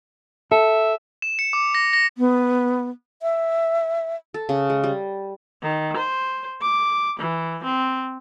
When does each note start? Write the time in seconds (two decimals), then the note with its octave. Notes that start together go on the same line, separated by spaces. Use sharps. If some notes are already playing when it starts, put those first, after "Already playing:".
0.52 A4 E5
1.22 E7
1.39 C#7
1.53 D6
1.75 A#6
1.93 A#6
2.18 B3
3.22 E5
4.34 A4
4.49 C#3
4.70 G#3
4.84 G3
5.62 D#3
5.97 C5
6.61 D6
7.19 E3
7.64 C4